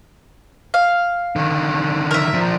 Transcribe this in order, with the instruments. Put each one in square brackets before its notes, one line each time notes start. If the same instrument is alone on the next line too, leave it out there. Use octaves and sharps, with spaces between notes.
[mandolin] F5
[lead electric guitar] D3 D#3
[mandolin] A#4 E5
[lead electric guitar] F3 D4